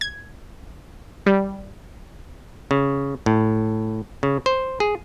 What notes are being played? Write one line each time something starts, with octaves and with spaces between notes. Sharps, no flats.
G#6
G3
C#3
A2
C#3
C5
G#4